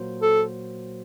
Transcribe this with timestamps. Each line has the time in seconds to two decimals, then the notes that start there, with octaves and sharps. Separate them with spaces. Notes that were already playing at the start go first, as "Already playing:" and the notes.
Already playing: A#2 F#3 A#3 F#4 C5
0.22 A4